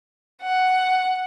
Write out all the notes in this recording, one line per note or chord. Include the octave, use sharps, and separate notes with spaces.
F#5